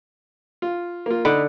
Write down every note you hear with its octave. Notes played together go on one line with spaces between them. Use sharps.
F4
A#3 F4
D3 D#4 B5